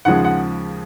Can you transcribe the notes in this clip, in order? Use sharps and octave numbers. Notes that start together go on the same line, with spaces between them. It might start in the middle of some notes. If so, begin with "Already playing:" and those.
D#2 C#3 F3 G#3 F#5
F#5